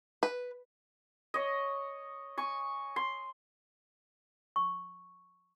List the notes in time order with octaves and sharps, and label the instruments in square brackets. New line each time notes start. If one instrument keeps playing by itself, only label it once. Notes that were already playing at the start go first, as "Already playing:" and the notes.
[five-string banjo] B4
[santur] C#5 D#5
G#5 C#6
C6
[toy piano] C#6